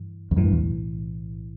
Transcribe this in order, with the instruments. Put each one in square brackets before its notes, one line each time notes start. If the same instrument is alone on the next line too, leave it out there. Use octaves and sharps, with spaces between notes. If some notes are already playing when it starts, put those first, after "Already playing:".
Already playing: [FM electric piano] G2 E3
[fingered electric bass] E2
[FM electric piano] B1 A2 E3 [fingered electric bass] F#2
[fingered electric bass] G2
E2